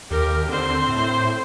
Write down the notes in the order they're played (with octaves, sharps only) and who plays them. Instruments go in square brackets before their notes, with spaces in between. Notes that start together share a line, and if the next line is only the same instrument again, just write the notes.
[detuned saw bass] D#2 [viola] G4 A#4
[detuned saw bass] D3 [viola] C4 C5
[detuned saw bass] A2